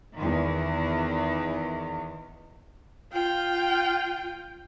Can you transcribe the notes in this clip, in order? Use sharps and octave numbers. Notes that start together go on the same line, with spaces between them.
E2 D#3
F4 G5